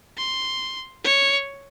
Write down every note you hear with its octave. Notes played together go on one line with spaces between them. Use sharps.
C6
C#5